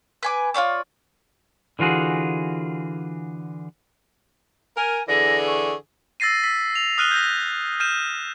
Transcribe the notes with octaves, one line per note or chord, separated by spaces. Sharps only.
B4 G#5 D6
F4 F#4 C#5 D5
D3 E3 F4 F#4 G#4
A#4 G#5
D3 E3 G#4 A#6
C#6
E6 A6 A#6 C7 D#7
E6 B6
F7
D#6 F6 F#6 D#7 G7
G6 A#6
F6 G6 D#7 E7